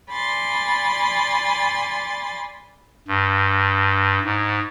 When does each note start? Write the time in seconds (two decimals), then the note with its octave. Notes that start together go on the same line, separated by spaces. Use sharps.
0.11 D5 G#5 B5 C6 A6
3.08 G2
4.25 G#2